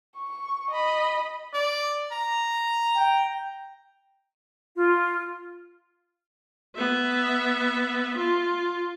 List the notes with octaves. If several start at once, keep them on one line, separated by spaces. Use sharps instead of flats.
C#6
D#5 B5
D5
A#5
G5
F4
B3 E5
F4